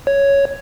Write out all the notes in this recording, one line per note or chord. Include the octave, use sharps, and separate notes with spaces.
C#5